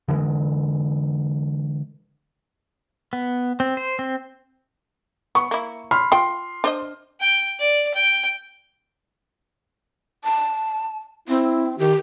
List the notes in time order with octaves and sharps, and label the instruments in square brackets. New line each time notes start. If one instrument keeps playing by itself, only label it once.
[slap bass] D3 E3 G3 G#3
[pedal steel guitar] B3
C4
C5
C4
[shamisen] B3 [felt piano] C#6
[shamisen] A#3 E4
[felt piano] B5 C6 F6
[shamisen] F4 G5 [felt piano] C6
[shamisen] D4 C5 D#5
[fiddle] G5
D5
G5
[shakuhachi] A5
[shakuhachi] C4 [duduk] E4
[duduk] D#3 [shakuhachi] G4